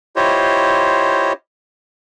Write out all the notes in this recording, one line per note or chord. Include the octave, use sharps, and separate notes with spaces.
E4 F4 G4 C5 C#5 D#5